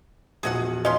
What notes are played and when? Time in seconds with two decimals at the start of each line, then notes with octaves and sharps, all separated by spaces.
0.43 E1 A#1 G#4 D#5 F#5
0.85 C#4 F4 D#5 C6